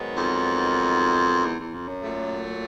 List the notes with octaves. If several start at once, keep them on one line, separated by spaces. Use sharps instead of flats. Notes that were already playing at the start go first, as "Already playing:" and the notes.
Already playing: G#2 D#3 F#3 B3 D#4
F2
E2
E2
F2
F#2
A#2 F#3 A3